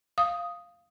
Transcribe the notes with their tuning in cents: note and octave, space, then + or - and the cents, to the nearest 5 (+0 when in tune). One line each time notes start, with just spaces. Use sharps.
F5 +0 D#6 +0